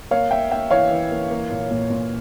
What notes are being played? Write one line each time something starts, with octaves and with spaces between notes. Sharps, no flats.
A#3 C#5 F5
A#3 E5 G5
A#3 E5 G5
E3 C#5 F5
E3
A#3
A#3
A#2
A#2
A#2